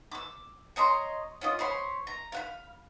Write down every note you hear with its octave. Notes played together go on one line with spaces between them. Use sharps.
D6 E6
C#5 D#5 A#5 C6
C#4 F4 D#5
C5 C#5 B5 C6
A#5
F5 F#5 B5